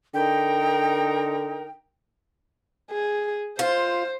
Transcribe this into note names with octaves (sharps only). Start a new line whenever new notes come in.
D3 D#4 A#4 G5
G#4
F4 C5